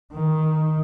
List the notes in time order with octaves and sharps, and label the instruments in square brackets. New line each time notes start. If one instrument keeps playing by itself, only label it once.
[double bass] D#3